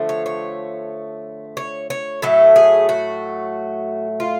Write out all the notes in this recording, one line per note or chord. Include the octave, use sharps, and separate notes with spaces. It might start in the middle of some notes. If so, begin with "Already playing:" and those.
Already playing: D3 F3 A3
C#5
C#5
C#5
C#5
A2 F#3 A3 A4
G#4
F#4
F4